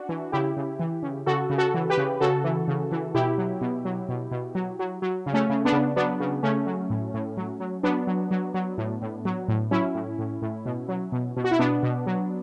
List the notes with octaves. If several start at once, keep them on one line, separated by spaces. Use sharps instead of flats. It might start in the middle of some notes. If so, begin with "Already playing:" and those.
Already playing: D4 F#4
E3
C#3 E4 G4
C#3
E3
C#3
C#3 F#4 A4
C#3
F#4 A4
E3
G4 B4
C#3
C#3 F#4 A4
E3
C#3
E3
B2 E4 G4
F#3
B2
F#3
B2
B2
F#3
F#3
F#3
C#3
A3 C#4
C#3
B3 D4
C#3
F#3 B3 D4
C#3
C#3 A3 C#4
F#3
A2
A2
F#3
F#3
F#3 B3 D4
F#3
F#3
F#3
A2
A2
F#3
A2
F#3 C#4 E4
A2
A2
A2
B2
F#3
B2
B2
F#4
E4
B2 B3 D4
B2
F#3